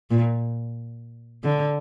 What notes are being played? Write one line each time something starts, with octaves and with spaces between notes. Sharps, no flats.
A#2
D3